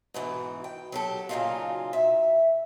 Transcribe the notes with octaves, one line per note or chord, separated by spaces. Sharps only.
G#2 B2 D#3 E3
G5
F#3 G4 A4
A#2 C#3 E3 F#3 D#4 F4
E5